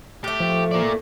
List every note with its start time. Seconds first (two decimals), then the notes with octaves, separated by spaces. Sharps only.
0.24 A2 A3 G4
0.40 F3
0.72 A#3 D5